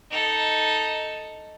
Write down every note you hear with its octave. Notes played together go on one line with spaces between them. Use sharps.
D#4 A4